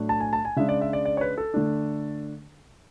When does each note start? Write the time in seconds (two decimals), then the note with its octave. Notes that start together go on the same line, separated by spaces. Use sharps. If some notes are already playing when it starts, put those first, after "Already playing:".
Already playing: A2 F#3 A3 D4
0.09 A5
0.20 G#5
0.33 A5
0.45 G#5
0.56 C#3 G#3 D4 E5
0.69 D5
0.81 E5
0.93 D5
1.05 D5
1.17 C#5
1.21 B4
1.38 A4
1.54 D3 A3 D4